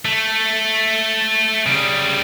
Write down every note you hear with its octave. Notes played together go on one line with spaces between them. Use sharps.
A3
C#3 G3